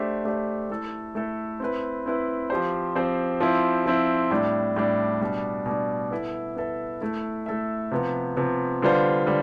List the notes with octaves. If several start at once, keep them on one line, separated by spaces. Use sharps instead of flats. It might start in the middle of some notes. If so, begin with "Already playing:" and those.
Already playing: A3 D4 G4 C5 E5
A3 D4 G4 C5 E5
A3 E4 A4
A3 E4 A4
C4 E4 B4
C4 E4 B4
F3 C4 G4 C5
F3 C4 G4 C5
F3 C4 E4
F3 C4 E4
A2 G3 D4
A2 G3 D4
B2 G3 D4
B2 G3 D4
B3 E4 A4 E5
B3 E4 A4 E5
A3 E4 A4 E5
A3 E4 A4 E5
C3 F3 B3
C3 F3 B3
D3 G3 B3 F4 C5
D3 G3